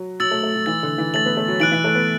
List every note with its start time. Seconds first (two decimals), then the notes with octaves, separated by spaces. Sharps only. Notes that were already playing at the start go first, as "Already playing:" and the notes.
Already playing: F#3
0.20 F#3 E6 A6 F#7
0.31 A3
0.43 A3
0.55 F#3
0.66 E3 A6 F#7
0.83 D3
0.98 E3
1.14 A3 A6 F#7
1.26 B3
1.37 A3
1.48 F#3
1.60 E3 F#6 D7 F#7
1.72 E3
1.84 A3
1.95 B3